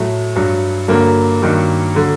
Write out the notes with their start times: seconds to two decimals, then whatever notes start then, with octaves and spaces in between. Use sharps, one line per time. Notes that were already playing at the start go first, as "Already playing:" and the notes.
Already playing: A2 F#3 A3
0.36 G2 F#3
0.88 G2 D3 F#3 A#3
1.42 G2 D#3 F#3
1.95 D3 F#3